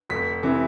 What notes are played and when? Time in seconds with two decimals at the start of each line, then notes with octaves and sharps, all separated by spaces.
0.10 F1 B6
0.43 C3 E3